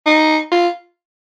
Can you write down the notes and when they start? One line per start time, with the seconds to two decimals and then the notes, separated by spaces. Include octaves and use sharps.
0.06 D#4
0.52 F4